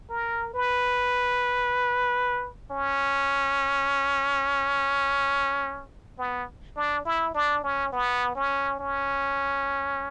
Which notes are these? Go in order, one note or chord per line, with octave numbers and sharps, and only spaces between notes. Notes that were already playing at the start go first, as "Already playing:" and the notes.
A#4
B4
C#4
B3
D4
E4
D4
C#4
B3
C#4
C#4